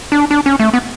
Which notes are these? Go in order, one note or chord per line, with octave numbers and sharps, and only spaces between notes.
D4
D4
C#4
A3
B3